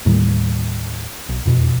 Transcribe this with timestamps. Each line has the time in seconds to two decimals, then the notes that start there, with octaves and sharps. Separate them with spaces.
0.05 D#2 A2 D#3 G3
1.29 B1
1.45 E1 F2 B2